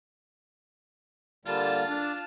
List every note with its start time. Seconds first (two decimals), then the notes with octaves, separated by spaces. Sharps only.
1.45 D3 G3 A#3 F4 A5
1.89 D4